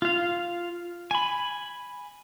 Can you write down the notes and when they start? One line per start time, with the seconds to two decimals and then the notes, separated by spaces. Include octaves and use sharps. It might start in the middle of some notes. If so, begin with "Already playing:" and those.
0.02 F4 F5
1.11 G#5 B5